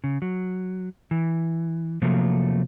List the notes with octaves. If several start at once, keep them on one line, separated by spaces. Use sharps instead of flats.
C#3
F#3
E3
C3 F3 F#3 A3 A#3